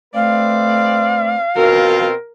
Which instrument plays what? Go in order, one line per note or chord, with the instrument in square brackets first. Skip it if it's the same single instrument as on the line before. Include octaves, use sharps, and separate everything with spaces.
[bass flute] A3 [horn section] C4 B4 D5 [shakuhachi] F5
[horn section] B2 C4 F4 [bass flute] F#4 [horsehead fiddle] A#4